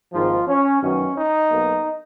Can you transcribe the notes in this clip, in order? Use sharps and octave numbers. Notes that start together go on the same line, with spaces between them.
G#1 G#2 D#3 F3 A#3 F4
C#4
F#2 D#3 F#3 B3 C#4
D#4
B1 B2 A#3